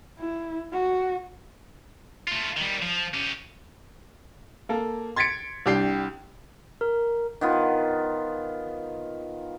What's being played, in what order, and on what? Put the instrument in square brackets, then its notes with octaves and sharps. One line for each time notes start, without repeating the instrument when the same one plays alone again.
[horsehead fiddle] E4
F#4
[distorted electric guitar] A3 F4
D#3 G3
F3
C#4 G4
[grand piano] A#3 A4
C6 G#6 A6 B6 C#7 D7
C2 D4 G4 G5 C7
[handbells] A#4
[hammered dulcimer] D#3 B3 F4